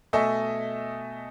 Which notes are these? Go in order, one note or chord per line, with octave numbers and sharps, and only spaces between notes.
B2 A3 D#5 E5 G#5 C#6